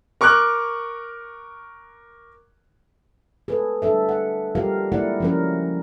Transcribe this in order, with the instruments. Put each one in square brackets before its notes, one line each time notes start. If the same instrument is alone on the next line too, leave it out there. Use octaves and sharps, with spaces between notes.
[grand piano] A#4 C#6 D6 F6 F#6
[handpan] G#4 A4 B4
G3 D4 A4 E5
F#5
G3 F4 G4 A#4 F5
G#3 A#3 E4 A#4 D5 F#5
F3 A#3 C#4 F#4 A#4